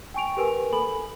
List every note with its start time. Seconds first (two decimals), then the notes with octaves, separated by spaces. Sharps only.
0.14 G5 G#5 C#6 D7 F7
0.37 G4 A#4 B4 G#5
0.73 A4 G#5 B5 F#7